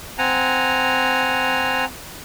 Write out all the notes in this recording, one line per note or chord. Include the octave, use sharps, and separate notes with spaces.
C4 F#5 G#5 A#5